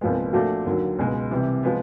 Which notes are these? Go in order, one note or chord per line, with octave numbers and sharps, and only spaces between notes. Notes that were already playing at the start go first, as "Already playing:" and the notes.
C2 A#2 F3 G#3 B3
A#2 F3 A3 D4 F#4
D#2 D3 F#3
C#2 B2 G#3
C3 E3 G3
F3 G#3 B3